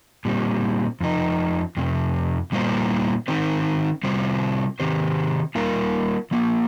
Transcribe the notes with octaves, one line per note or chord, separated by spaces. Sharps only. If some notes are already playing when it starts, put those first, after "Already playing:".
A#2 G3 C4
F2 F3 D#4
F2 C3
A#2 G3 A#3 F4 C5
D#3 C4 D#4 C5
C3 G3 C4 F4 C5
C3 D#3 C4 G4 C5
G3 A#3 F4 A#4 F5
F3 A#3 F4